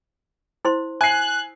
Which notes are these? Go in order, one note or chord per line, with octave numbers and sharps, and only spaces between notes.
E4 C5 C6
G#5 F#6 C7